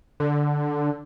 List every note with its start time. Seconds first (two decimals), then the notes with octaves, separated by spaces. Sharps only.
0.20 D3